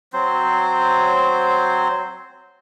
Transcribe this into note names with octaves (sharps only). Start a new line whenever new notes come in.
F#3 C4 C5